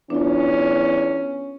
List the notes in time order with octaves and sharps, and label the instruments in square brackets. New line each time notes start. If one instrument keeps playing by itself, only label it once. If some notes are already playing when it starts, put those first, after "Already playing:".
[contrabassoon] E2 [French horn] C#4 [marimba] D4 F4